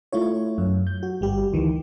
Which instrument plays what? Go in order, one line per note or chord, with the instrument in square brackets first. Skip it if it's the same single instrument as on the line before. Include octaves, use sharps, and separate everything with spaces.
[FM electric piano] A3 E4 F4 C#5
F#2
G6
F#4
G1 G3 G4
D2 D#3 E3